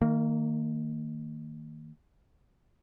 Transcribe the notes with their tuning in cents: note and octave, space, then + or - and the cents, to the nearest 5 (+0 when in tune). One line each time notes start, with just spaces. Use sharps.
D#3 +0 A#3 -30